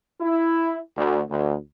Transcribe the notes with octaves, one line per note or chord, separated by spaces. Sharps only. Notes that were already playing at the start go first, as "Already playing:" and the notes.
E4
D2
D2